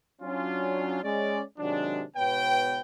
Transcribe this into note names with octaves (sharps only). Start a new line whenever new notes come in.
F#3 C#4 D4 F4
G#3 C#4 D5
C3 D#3 F#3 G#3 D4
G#2 B2 B3 B4 C#5 G5